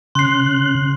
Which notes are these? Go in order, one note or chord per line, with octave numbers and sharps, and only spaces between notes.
C#3 C6 F#6 C7